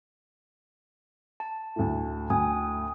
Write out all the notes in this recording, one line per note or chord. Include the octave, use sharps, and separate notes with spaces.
A5
D2 A2
D2 G5 G#5 D#6